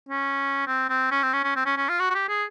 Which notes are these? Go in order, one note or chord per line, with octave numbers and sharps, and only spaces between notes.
C#4
C4
C4
C#4
C4
C#4
C#4
C4
C#4
C#4
F4
F#4
F#4
G4
G#4